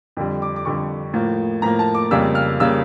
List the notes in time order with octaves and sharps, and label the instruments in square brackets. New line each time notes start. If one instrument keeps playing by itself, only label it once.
[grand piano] F2 D3 G3
D6
D6
F2 D3 G3 C#6
A2 F3 A#3
A2 F3 A#3 A#5
A5
D6
F2 C#3 G3 A#3 E6
F6
C#3 G3 A#3 E6